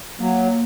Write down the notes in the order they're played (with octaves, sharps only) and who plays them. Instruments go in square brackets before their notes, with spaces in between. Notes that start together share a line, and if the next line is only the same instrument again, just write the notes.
[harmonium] F#3 [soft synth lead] A#3